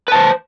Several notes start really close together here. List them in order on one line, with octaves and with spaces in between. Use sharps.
B4 A5 C5